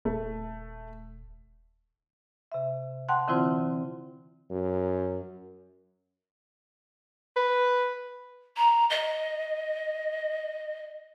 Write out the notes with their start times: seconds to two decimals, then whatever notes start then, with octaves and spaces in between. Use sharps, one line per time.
0.05 D#1 A3
2.52 C3 E5
3.09 F#5 G5 A5 C6 F#6
3.28 D3 E3 C4 E4 F4 C5
4.50 F#2
7.37 B4
8.56 A#5
8.90 D#5